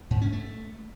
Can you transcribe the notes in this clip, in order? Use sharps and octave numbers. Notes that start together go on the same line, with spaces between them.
G#2
C#4
A3